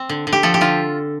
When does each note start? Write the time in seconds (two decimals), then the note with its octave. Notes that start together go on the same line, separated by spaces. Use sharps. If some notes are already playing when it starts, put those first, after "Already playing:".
Already playing: C4
0.09 D3
0.27 D3
0.33 G4
0.43 F3 A4
0.54 G4
0.61 D3 F4